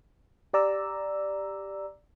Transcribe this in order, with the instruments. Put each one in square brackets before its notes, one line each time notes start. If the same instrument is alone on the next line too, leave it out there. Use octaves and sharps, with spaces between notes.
[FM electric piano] G4 D5 A#5 E6